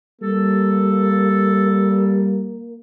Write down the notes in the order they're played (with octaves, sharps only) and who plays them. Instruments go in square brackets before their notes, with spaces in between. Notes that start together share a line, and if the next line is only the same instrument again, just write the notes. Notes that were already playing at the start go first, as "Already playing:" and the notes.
[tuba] G3 [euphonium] A#3 [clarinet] A4